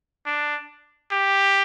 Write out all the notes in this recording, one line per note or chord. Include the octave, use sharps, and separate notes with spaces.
D4
G4